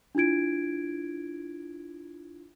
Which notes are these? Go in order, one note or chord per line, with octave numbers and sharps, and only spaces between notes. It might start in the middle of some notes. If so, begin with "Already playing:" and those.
D4 E4 F4 G#6 D7